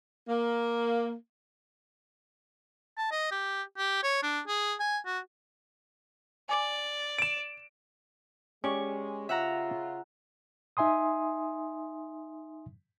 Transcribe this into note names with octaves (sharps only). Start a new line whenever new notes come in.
A#3
A5
D#5
G4
G4
C#5
D4
G#4
G#5
F#4
D5 G#5 D6 F#7
D7 E7
G#3 C#4 G4 D5 C#6
C#3 F4 E5 F#5 A#5
D#4 E5 G#5 C6 D#6